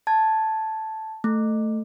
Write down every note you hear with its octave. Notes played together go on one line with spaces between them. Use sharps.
A5 G#6
A3